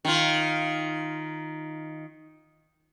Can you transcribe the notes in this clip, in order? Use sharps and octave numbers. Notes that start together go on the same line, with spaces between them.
D#3 F4